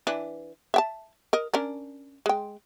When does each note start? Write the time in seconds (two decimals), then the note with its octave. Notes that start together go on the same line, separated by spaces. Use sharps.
0.07 E3 D4 B4
0.74 E5 G5 A5
1.33 A#4 D#5
1.54 C#4 D4 A#4
2.26 G#3 G5